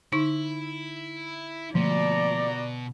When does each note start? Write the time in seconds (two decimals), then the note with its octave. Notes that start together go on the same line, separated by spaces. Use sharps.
0.12 D3 D#4 E4 C#6
1.75 B2 D3 F3 A3 A#3 D5 A#5